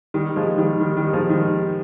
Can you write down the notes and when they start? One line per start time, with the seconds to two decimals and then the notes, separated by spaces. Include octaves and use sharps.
0.14 D#3 G3
0.36 F3 G#3
0.58 D#3 G3
0.80 D#3 G3
0.97 D#3 G3
1.13 F3 G#3
1.30 D#3 G3